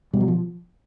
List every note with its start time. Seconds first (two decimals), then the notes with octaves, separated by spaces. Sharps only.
0.13 B2 G3
0.21 F#3
0.28 F3